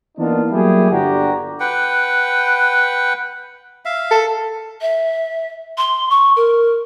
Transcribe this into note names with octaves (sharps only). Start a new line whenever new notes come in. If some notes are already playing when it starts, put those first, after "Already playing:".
E3 A#3 B3 D4 D#4 F4
F#3 G3 A#3 E4 G4 G#4
G1 G2 D3 F#4 G4 A#5
B4 F#5 G5
E5 F5
A4
E5
C6
C#6
A#4